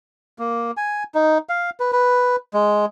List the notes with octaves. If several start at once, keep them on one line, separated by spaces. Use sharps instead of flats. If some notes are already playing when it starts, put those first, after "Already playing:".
A#3
G#5
D#4
F5
B4
B4
G#3